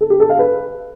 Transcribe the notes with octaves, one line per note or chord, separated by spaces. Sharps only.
A4
G4
A4
F5
B4